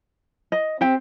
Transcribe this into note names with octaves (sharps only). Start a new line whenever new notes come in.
D#5
C4 G4 C5 G5